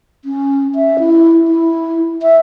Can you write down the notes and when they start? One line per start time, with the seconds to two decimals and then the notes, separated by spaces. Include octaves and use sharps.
0.25 C#4
0.75 E5
0.99 E4
1.48 E4
2.22 E5